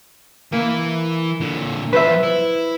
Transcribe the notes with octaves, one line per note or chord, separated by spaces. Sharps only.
E3 A#3 E4
A#2 D3
E2 F3 B4 C5 E5
E4